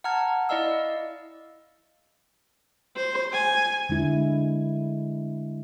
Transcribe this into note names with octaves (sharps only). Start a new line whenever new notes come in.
F#5 A5 A#5 F6 G#6
E4 D5 D#5 F5 E6
C5
G#5
D3 G#3 E4